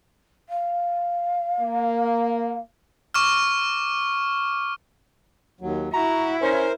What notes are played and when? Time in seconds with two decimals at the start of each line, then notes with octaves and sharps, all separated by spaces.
0.49 F5
1.61 A#3
3.14 C#6 D6 F6
5.61 D#2 F#3
5.94 E4 F#4 A#5
6.42 C#4 A#4 C5